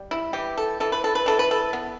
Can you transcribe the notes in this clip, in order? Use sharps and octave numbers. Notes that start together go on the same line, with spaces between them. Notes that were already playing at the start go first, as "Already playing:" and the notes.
Already playing: G3
E4
E3 G4
A4
E3 A4
B4
A4
B4
E3 A4
B4
A4
B3